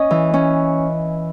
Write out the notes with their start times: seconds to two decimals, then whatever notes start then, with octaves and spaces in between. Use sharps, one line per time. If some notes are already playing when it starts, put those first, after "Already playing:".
Already playing: C#4 D#5
0.11 E3
0.34 C#4